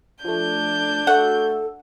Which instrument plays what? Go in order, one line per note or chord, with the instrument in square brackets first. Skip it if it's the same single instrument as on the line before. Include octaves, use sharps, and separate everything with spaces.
[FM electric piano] F3 A3 [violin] D4 G6
[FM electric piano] A3 F#4 [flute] A4 [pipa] F#5